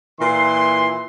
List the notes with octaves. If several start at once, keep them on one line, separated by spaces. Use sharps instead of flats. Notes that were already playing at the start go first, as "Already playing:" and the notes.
A#2 E3 C6